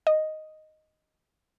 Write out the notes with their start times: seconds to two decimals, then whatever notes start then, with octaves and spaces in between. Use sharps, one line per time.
0.07 D#5